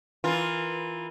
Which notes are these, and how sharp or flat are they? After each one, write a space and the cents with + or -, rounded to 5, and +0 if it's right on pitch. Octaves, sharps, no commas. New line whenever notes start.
E3 -5 F4 +0 A#4 +0